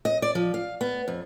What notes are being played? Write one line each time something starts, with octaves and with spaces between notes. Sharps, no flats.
D#5
D5
F3
F5
B3
F2